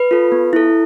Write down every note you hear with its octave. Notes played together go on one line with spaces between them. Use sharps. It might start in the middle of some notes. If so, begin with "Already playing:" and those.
Already playing: B4
F4 A4
B3
E4 A4